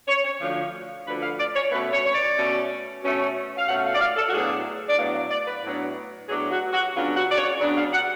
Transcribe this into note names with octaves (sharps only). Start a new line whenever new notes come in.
C#5
C#5
D2 D3 F3
D2 D3 F3 B4
F5
D5
C#5
B2 A3 C#4 B4
C#5
C#5
D5
B2 A3 C#4
B2 A3 C#4
F5
B2 A3 C#4 F#5
F5
D5
F5
A4
F#4
A2 F#3 B3 D4 G#4
D5
A2 F#3 B3 D4 F5
F5
D5
B4
A2 F#3 B3 D4
A2 F#3 B3 D4 G#4
F#4
F#4
C#3 F#3 B3 D4 F4
F#4
D5
C#5
C#3 F#3 B3 D4 D5
F5
F#5